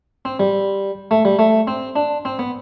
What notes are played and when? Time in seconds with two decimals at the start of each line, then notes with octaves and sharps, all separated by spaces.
0.25 C4
0.40 G3
1.11 A3
1.25 G3
1.39 A3
1.67 C4
1.96 D4
2.25 C4
2.39 B3